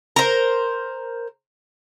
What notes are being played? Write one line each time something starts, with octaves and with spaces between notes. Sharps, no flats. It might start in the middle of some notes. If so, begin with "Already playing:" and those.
A#4 C5